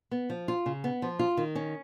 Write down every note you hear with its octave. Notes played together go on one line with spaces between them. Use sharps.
B3
F3
F4
C#3
B3
F3
F4
D#3
C#4